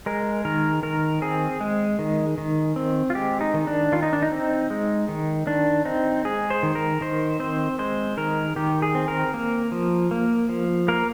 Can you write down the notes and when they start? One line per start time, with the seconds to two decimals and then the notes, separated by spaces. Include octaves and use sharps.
0.06 G#3 A#4
0.45 D#3 A#4
0.83 D#3 A#4
1.22 C4 G#4
1.60 G#3
1.99 D#3
2.38 D#3
2.76 C4
3.10 F4
3.15 G#3 G4
3.41 D#4
3.54 D#3
3.67 D4
3.92 D#3 F4
4.03 D#4
4.13 D4
4.22 D#4
4.32 C4
4.70 G#3
5.08 D#3
5.47 D#3 D4
5.85 C4 D#4
6.25 G#3 G#4
6.50 C5
6.63 D#3
6.75 A#4
7.01 D#3 C5
7.40 C4 C5
7.79 G#3 C5
8.17 D#3 A#4
8.56 D#3 G4
8.82 G#4
8.95 C4
9.08 A#4
9.34 A#3
9.72 F3
10.11 A#3
10.49 F3
10.88 A#3 A#4